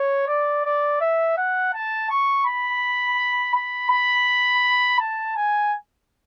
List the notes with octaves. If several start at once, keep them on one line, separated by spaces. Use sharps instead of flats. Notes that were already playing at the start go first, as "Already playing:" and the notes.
Already playing: C#5
D5
D5
E5
F#5
A5
C#6
B5
B5
B5
A5
G#5